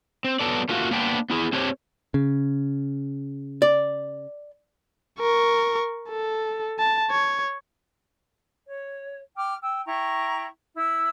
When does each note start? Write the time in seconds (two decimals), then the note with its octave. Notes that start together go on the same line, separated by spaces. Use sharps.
0.25 C4
0.39 F#3 B3 A4 D5
0.69 A3 A#3 F4 F#4
0.91 A#3 B3 D4 G5
1.30 B3 E4 G#4
1.53 C4 D4 G4 C5 C#5
2.14 C#3
3.62 D5
5.20 A#4 C#6
6.10 A4
6.79 A5
7.11 C#5
8.66 C#5
9.36 G5 D6 F6
9.61 G5 E6
9.85 E4 G5 A#5 C#6
10.73 E4 E6